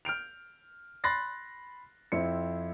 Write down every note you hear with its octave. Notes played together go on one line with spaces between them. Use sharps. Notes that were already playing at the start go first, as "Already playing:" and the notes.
F6 G6 D7 F7
B5 C6 F#6 A6 A#6 C7
F2 C4 E4 C#7